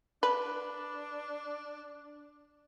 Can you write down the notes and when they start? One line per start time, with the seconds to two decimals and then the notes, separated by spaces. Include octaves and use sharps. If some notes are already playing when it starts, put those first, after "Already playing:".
0.23 D4 B4